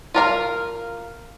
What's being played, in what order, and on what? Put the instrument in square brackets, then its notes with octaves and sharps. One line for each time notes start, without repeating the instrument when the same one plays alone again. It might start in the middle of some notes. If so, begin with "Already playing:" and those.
[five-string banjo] F4 A#4 F5